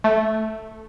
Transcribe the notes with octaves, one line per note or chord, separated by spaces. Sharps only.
A3